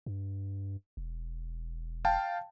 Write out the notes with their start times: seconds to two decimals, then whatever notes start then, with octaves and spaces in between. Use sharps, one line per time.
0.06 G2
0.97 E1
2.05 F5 G5 A5